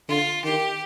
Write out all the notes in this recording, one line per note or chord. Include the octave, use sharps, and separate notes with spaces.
D3 F4
D#3 G4